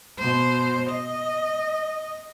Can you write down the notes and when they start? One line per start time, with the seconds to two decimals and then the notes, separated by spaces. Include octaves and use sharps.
0.19 B2 C5
0.90 D#5